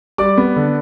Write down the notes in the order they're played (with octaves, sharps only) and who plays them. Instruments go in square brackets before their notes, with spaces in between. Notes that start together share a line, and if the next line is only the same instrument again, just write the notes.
[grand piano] G3 D5 D6
B3
D3